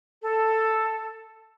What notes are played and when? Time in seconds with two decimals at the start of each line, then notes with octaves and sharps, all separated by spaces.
0.21 A4